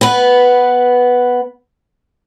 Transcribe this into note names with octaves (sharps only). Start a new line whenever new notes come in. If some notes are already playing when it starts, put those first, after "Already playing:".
B3 B4